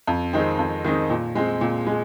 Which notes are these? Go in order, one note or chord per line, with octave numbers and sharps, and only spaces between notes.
F2
D#3 G#3 C4 D#4
F2
D#3 G#3 C4 D#4
A#2
G#3 C4
A#2
G#3